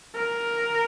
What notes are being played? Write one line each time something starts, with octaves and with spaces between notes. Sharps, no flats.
A#4